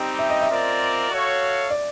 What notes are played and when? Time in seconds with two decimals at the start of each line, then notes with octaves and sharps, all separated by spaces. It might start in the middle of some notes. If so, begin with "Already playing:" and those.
Already playing: G3 C4 D#4 G4 D#5
0.19 E5
0.30 D#5
0.41 E5
0.50 C4 F4 A#4 D5
1.10 F#4 A4 C#5 F5
1.71 D5